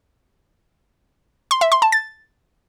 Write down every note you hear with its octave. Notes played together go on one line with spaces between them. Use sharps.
C6
E5
C6
A5
A6